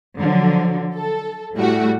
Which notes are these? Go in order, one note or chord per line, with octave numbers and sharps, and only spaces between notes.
D3 F3 F#3
A4
A2 G3 A3 F#4